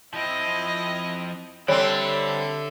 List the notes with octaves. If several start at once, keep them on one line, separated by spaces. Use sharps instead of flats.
F3 C4 E4 D#5
D3 G3 C4 A4 C#5 E5